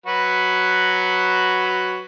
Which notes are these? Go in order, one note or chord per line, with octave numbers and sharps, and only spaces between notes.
F#3 F#4 B4